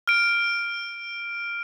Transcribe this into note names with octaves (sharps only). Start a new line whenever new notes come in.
F6 D7